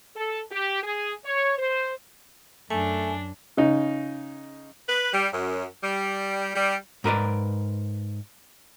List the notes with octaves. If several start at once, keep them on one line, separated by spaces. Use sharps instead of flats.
A4
G4
G#4
C#5
C5
F#2 A3 D4 G#5
C#3 D#4
B4
G3
F#2
G3
G3
G#2 A#4 B4 D5